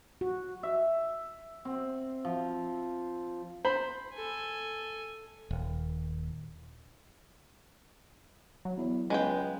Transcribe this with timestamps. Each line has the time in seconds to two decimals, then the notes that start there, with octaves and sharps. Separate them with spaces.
0.21 F#4
0.63 E5
1.65 C4
2.25 F3
3.65 C5 B5
4.15 A4 G#5
5.51 D#1
8.65 F#3
8.77 E2
9.10 C#2 G#3 B3 G5